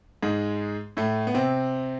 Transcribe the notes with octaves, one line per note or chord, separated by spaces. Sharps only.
G#2 G#3
A2 A3
B3
C3 C4